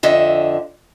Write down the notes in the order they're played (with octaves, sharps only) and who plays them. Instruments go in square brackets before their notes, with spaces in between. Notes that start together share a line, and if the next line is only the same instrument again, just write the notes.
[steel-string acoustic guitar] F2 D3 D#5 E5